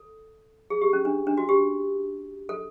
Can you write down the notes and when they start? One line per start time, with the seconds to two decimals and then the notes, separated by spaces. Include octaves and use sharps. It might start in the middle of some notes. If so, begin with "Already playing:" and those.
Already playing: A4
0.70 G#4
0.82 G4
0.93 C#4
1.05 D4
1.27 D4
1.38 F#4
1.49 G4
2.49 A4